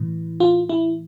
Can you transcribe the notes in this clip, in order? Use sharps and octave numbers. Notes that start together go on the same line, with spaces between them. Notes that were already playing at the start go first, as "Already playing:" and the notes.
Already playing: A2 E3
F4
E4